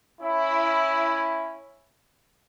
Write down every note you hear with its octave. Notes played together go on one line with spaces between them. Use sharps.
C#4 E4